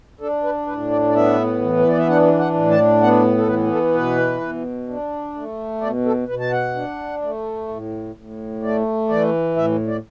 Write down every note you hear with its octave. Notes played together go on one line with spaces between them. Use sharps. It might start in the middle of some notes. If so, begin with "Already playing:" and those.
D4 A4
B4
A2 B4
D5
D5
B3 E5
E3
B4
D5
E5
D4 F#5
F#5
A2
A5
B3 F#5
A4
E3 B4
A4
B2 B4
B2
D4
A3
B2 D5
A4
B2 B4
A5
F#5
D4
A3
A2
A2
A3 D5
E3 D5
A2 E5
D5